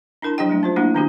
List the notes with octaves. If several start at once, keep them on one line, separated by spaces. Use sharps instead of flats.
D4 E4 A#4 A5 C6
F3 F#3 D4 G4 D#5 G5
G#3 A3 D4
C#4 F4 C5
A3 A#3 D4 E4 F#4
D#3 C4 D4 E4 F#4 G4